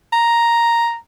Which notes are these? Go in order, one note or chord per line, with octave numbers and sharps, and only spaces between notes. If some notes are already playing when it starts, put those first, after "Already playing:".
A#5